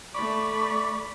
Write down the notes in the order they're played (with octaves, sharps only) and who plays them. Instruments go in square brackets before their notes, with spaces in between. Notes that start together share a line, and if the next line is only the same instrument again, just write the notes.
[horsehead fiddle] A3 B5 [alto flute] D5 [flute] C#6 [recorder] D6